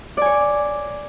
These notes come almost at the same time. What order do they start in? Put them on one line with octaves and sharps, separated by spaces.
D5 G#5 C#5